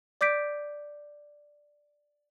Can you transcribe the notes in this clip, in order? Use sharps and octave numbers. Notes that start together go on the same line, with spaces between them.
D5 D6 G6 B6 D7